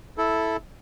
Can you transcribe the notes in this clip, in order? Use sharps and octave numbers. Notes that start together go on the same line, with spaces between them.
E4 A4